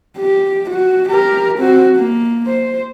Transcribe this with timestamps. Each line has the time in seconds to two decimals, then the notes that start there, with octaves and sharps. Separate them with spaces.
0.18 G4
0.70 F#4
1.09 G4 A#4
1.58 C4 F#4
1.96 A#3
2.47 C5